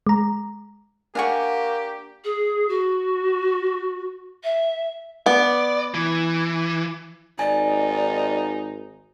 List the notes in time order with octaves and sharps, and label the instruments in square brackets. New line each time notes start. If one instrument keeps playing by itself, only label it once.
[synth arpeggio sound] G#3 A#5
[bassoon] A#3 [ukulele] D4 F#5 [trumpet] G4 [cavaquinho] F5 G#5 C#6
[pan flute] G#4
F#4
E5
[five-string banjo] B3 [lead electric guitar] D5
[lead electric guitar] E3
[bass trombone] G#1 [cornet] D#4 [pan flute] D5 [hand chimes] G#5